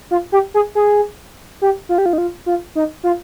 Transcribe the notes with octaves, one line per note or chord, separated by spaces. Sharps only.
F4
G4
G#4
G#4
G4
F4
G4
F4
D#4
F4
F4
D#4
F4